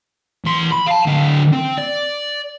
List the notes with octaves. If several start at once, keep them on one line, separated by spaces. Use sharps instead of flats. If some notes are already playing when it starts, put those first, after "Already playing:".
E2 C6
B5
F5 A5
D2 F5
C4
D5